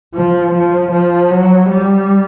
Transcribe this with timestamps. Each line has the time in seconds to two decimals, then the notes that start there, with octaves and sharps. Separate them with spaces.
0.14 F3
0.54 F3
0.92 F3
1.31 F#3
1.70 G3